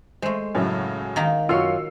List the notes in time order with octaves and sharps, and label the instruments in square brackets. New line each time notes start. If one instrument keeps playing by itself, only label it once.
[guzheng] G#3 A3 [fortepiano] C5
[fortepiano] F#2 A2 [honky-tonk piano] C#3 F#3 C#4
[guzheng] D#3 A#3 D#4
[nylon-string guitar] F#2 F5 [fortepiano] F4 F#4 [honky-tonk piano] E6 C7 C#7